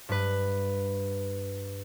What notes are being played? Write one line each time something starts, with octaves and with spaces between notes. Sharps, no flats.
G2 B4